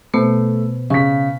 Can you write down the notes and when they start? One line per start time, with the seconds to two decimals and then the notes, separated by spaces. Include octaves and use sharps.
0.14 B2 A3 B3 C5
0.90 C#3 C#6 B6